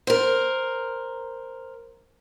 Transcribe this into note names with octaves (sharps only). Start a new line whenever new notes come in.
A#4 C5